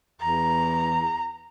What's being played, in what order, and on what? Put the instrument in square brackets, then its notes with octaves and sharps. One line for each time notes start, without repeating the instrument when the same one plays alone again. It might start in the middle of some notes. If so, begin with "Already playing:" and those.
[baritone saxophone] E2 [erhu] A#5